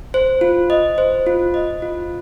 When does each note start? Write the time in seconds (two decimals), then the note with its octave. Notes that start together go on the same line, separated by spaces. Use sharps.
0.14 C5
0.41 F4
0.70 D#5
0.98 C5
1.27 F4
1.54 D#5
1.82 F4